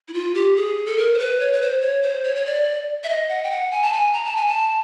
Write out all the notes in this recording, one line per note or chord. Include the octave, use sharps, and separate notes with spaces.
E4
F4
G4
G#4
A4
A#4
C5
B4
C#5
B4
C5
C#5
C5
C#5
C#5
D5
E5
D#5
F#5
G5
F#5
G#5
A5
G#5
A#5
A5
G#5
A5